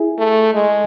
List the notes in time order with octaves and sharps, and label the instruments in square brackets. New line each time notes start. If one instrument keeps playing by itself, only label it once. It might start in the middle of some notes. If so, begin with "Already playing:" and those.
Already playing: [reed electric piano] E4 G#4
[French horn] A3
G#3